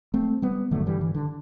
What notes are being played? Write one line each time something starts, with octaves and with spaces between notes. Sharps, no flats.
A3 C4
G3 B3
G2 D3 F#3 A3
E3 G3
E3
D3